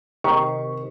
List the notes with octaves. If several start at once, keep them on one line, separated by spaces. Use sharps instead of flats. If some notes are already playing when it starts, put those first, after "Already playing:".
C3 D#3 C#6